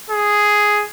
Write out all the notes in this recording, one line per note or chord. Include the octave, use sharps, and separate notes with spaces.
G#4